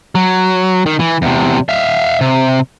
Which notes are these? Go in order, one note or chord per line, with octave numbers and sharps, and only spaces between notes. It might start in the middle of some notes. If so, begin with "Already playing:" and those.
F#3
D#3
E3
E2 C3
E5 F5
C3